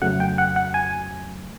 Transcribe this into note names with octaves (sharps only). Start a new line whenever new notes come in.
F2 C#3 F#3 A3 F#5
G5
F#5
F#5
G#5